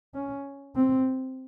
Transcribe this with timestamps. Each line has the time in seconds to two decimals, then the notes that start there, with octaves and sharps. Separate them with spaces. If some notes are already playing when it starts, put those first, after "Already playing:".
0.15 C#4
0.76 C4